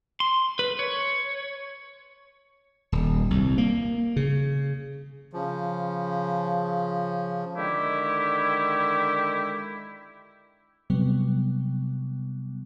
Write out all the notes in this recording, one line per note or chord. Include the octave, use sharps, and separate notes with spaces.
C6
B4
C#5
D#1
C2
A#3
C#3
C#3 F3
D3 D#3 G#3 E4 G4
C3 F#3 G3 B3